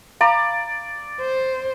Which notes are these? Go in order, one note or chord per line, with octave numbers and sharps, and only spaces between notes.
D5 F5 A#5 B5
C5